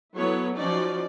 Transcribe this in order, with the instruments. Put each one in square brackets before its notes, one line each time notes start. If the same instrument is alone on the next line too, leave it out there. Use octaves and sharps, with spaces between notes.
[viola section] F#3 B3 E4 A4 C#5
F3 C#4 D#4 F#4 D5